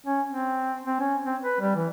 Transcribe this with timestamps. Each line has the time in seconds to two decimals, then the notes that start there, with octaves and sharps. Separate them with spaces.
0.06 C#4
0.29 C4
0.85 C4
1.00 C#4
1.26 C4
1.42 B4
1.60 G3
1.75 E3